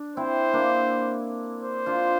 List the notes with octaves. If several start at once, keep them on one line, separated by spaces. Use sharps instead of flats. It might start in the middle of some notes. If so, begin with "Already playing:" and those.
Already playing: D4
C4 E4 C5
A#3 D4
C5
D4 F4